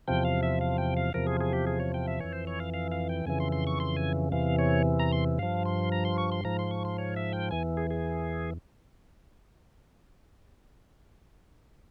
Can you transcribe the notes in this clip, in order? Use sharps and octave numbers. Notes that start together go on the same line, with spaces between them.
E2 C3 F3 G5
F5
E5
F5
G5
F5
E2 C3 F3 A#4
G#4
G#4
G4
G#4
C#5
G5
E5
F2 E3 C#5
C5
C#5
F5
F5
F5
G5
F2 C#3 E3 G#5
C6
C6
C#6
C6
G#5
E2 C3 E3 F5
C#5
A#5
C6
G2 F3 F5
C6
A#5
C6
C#6
C6
G#2 F3 A#5
C6
C#6
C6
C#5
E5
G5
E2 E3 G#5
G#4
G#4